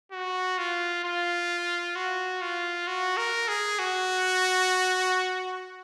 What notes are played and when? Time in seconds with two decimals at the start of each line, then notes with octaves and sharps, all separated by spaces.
0.12 F#4
0.58 F4
1.04 F4
1.96 F#4
2.42 F4
2.87 F#4
3.17 A#4
3.48 G#4
3.79 F#4